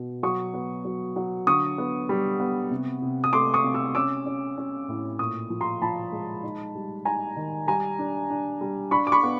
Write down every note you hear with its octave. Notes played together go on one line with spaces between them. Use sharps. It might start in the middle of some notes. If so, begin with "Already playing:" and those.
Already playing: B2
F#3 C#6 D#6
B3
F#3
F#3
D3 C#6 D#6
B3
G3
B3
C3
C3
D#6
A3 C6 D6
C#6 D#6
C3
D6 E6
C#4 D6 E6
C#4
C#4
A2
A#2 C#6 D#6
F3
A#5 C6
F3 A5 B5
G#3
D#4
G3
D#4 G#5 A#5
D#3
G3 G#5 A#5
D4
D4
G3
D4 B5 C#6
D6
B5 C#6
B3